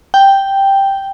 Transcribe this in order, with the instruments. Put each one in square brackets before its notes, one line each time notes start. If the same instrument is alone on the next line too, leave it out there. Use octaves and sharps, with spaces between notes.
[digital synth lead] G5